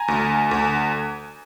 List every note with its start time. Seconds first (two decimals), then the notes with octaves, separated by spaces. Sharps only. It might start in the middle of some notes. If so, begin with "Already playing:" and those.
Already playing: G#5 A#5
0.08 D2
0.51 D2